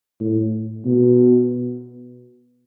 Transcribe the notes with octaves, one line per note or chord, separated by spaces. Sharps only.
A2
B2